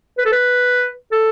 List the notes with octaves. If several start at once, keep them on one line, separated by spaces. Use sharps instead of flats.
B4
A4
B4
A4